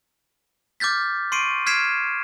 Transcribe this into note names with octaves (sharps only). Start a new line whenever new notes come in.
D6 F6 G6 A6 B6
C6 C#6 C7 D7 D#7
F6 G#6 B6 C7 D7 E7